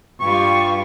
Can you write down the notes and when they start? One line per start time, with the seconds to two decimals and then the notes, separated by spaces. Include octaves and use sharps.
0.20 G2 G3 F4 C#6